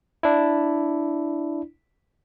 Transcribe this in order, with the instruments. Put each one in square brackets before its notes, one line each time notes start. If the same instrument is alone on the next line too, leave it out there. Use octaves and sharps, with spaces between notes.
[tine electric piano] D4 E4